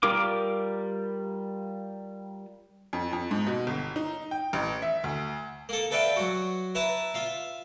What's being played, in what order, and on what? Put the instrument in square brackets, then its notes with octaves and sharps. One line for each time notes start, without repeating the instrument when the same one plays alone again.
[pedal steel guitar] G3 F4 A#4 D6
[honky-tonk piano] F2
F2
G#2
B2
G1
D#4
G5
A1
E5
D2
[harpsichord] A#3 A4
A4 B4 D5 E5 F5 G5
F#3 F#4
E4 B4 E5 A5 A#5
F4 E5 F5